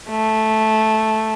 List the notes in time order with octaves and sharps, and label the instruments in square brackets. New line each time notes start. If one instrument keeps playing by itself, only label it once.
[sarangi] A3